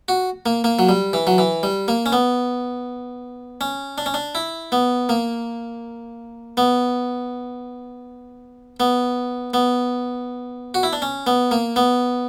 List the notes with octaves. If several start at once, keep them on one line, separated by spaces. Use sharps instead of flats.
F#4
A#3
A#3
F#3
G3
E3
F#3
E3
G3
A#3
C#4
B3
C#4
D4
C#4
D4
E4
B3
A#3
B3
B3
B3
F#4
E4
D4
C#4
B3
A#3
B3